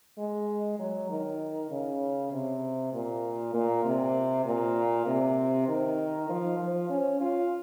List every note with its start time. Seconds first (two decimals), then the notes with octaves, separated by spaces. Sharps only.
0.18 G#3
0.79 F#3
1.10 D#3
1.71 C#3
2.32 C3
2.93 A#2
3.54 A#2
3.84 C3
4.45 A#2
5.06 C3
5.68 D#3
6.29 F3
6.59 F3
6.89 C#4
7.21 F4